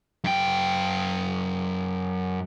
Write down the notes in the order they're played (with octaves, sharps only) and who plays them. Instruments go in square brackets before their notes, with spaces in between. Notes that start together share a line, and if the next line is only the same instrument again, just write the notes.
[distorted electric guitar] F#2 G5